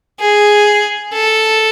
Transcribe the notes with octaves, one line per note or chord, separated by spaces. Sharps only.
G#4
A4